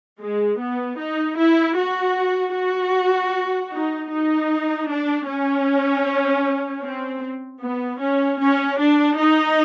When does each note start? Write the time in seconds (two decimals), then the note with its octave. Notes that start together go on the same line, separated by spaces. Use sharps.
0.20 G#3
0.59 B3
0.98 D#4
1.37 E4
1.75 F#4
2.54 F#4
3.71 D#4
4.11 D#4
4.89 D4
5.28 C#4
6.83 C4
7.62 B3
8.00 C#4
8.40 C#4
8.79 D4
9.18 D#4